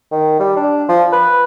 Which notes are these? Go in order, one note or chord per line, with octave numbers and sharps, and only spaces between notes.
D#3
G3
D4
F3
B4